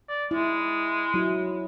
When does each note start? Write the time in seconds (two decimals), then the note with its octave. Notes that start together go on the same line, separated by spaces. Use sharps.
0.08 D5
0.31 G#3 E4
1.14 F#3 E4